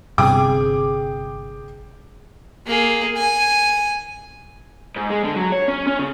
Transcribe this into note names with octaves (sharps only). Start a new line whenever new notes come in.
G1 G2 C3 G#4 G5 D6
A#3 G#4
G#5
G#2
G#3
D3
F#3
C#5
C#4
C#4
C#3